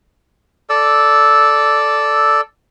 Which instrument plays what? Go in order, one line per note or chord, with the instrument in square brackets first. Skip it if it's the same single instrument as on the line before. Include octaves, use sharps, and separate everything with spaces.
[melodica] A4 D5 E6